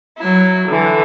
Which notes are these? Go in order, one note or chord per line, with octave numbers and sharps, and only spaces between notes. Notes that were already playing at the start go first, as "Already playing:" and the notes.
F#3 E4
D3 E3